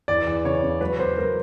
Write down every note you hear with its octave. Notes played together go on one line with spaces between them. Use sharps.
E2 D5
E2
C#3 C#5
C#3
F#3 B4
B3 C5
F#3 A#4